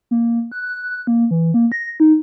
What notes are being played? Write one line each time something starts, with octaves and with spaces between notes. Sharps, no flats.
A#3
F#6
F#6
A#3
E3
A#3
A#6
D#4